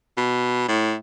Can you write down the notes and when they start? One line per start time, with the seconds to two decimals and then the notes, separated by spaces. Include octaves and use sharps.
0.17 B2
0.68 A2